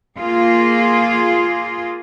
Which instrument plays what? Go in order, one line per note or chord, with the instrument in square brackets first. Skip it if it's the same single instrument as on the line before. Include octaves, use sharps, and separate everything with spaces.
[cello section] A#3 F4 G#4